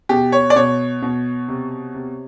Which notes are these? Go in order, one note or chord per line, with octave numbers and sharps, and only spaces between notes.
B2 G4
C#5
D5
B2 C#5
B2
C3
C3